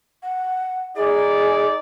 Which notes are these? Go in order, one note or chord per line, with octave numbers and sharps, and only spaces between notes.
F#5
D#4 G#4 D5